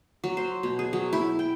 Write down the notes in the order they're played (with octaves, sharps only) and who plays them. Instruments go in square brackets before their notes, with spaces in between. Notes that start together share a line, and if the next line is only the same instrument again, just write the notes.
[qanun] F#3
C5
B2
G#4
F#3
E4
G5